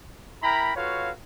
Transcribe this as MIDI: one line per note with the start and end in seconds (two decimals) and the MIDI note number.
0.43 0.73 64
0.43 0.73 70
0.43 0.73 79
0.43 0.73 82
0.43 0.73 83
0.76 1.11 65
0.76 1.11 66
0.76 1.11 69
0.76 1.11 71
0.76 1.11 73
0.76 1.11 77